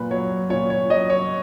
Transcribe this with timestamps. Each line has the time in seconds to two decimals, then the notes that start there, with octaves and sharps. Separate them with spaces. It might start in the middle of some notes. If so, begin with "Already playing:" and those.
Already playing: A#2 F#3 B4
0.11 F#3 C#5
0.50 A#2 C#5
0.70 C#5
0.90 F#3 D#5
1.10 C#5